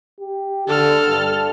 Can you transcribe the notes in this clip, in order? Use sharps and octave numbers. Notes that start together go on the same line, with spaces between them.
G4
D3 A4 F6
G2